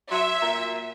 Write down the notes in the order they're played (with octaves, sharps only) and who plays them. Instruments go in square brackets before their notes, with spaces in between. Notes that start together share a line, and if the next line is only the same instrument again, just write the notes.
[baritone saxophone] F#3 [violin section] E5 [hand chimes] C6 G#6
[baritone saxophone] A#2 [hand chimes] A#5